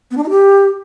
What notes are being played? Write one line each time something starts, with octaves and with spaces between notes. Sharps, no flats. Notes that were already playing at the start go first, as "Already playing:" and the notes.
B3
D4
D#4
G4